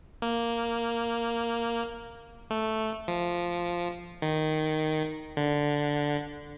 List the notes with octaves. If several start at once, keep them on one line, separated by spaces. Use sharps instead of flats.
A#3
A3
F3
D#3
D3